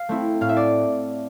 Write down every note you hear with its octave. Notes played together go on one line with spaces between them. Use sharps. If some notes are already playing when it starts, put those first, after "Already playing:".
Already playing: F5
A3 C4 E4
A2 F5
E5
D5